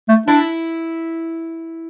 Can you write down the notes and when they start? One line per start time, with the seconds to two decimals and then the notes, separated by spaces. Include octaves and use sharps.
0.08 A3
0.27 D4 E4